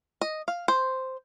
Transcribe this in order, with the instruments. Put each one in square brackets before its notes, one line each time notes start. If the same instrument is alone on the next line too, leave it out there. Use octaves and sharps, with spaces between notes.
[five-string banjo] D#5
F5
C5